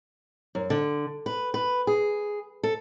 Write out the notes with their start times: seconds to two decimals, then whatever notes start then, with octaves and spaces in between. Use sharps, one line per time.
0.55 F#2
0.70 D3
1.26 B4
1.54 B4
1.87 G#4
2.63 A4